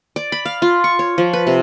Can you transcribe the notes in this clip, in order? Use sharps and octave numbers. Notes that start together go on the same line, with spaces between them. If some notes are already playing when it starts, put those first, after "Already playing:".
D5
B5
F5
F4
C#6
C#5
F3
B4
C3